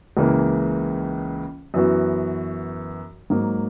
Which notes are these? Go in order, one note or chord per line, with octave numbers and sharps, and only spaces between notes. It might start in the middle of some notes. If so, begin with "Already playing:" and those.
C#2 C#3 E3 A#3
F#2 E3 B3 F#4
G#2 F#3 A#3